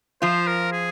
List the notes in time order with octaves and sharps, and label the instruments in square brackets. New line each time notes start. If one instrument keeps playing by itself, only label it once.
[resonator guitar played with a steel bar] F3 F4 [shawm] C5
[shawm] A#4
G#4